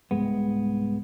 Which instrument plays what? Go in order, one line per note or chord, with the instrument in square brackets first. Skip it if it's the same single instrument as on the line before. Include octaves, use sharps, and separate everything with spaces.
[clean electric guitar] C2 G#2 G#3 B3